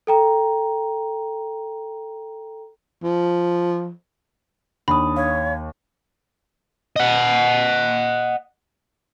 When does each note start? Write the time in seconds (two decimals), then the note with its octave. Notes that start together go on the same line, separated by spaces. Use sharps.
0.07 A4 G5 A#5
3.04 F3
4.88 D#2 D4 B5 D#6
5.17 C#5 F5
6.96 D#5 F#5